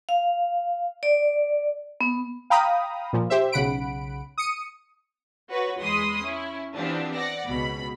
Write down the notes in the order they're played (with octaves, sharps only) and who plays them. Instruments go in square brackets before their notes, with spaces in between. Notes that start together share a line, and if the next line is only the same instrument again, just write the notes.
[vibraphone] F5
D5
B3
[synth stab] F5 G5 A#5 B5 D#6
A#2 F3
G4 C5 E5
B1 C#3 F#5 B5 D7
D#6 C#7 D#7
[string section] F#4 B4 C#5
E2 G#3 B5 C6 D#6
C#4 E4
E3 B3 C4 D4 F4 G4
D5 F#5 A#6
C#2 B2 B5